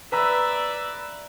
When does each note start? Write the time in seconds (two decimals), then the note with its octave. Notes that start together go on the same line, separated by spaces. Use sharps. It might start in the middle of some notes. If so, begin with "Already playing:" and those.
0.12 B4 D5 E5 A#5 E6